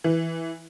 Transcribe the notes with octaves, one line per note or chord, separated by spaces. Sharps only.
E3